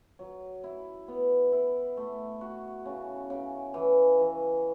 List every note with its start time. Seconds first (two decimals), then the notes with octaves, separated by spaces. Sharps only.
0.19 F#3
0.64 E4
1.08 B3
1.52 E4
1.97 A3
2.41 F#4
2.86 C#3
3.30 C#3
3.74 E3
4.19 E3